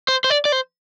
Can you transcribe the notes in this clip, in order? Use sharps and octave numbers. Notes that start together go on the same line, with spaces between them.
C5
C5
D5
D5
C5